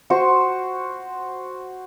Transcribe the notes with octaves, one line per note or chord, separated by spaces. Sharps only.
F#4 C5 C#6